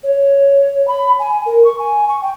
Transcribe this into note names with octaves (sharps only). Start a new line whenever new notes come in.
C#5
B5
G#5
A#4
C#6
G#5
C#6
G5